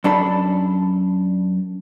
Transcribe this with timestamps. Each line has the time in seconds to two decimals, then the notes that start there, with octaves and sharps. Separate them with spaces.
0.04 F#2 D4 A4 B5